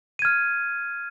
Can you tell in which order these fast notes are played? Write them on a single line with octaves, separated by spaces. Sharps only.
D#7 G#6 F6